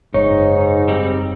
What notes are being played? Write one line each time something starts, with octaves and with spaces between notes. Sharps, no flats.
F#1 G#2 D#4 C#5
G3 C4 D#4